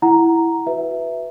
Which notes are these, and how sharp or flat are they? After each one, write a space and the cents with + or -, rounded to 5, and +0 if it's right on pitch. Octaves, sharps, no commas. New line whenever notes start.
E4 +5 F#5 +0 A#5 +0
F#4 +0 B4 +0 E5 +0